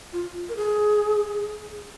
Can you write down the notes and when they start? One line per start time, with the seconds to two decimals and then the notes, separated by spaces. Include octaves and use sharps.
0.13 F4
0.49 A#4
0.56 G#4